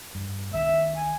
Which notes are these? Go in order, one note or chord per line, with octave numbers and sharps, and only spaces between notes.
G2
C2 D#3 E5
G#5